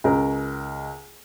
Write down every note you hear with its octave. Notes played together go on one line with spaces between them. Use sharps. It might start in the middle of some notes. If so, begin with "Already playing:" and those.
C#2 A#4